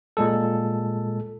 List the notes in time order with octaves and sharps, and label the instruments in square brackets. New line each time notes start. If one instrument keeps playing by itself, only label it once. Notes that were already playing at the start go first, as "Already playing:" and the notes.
[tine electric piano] A#2 G#3 A4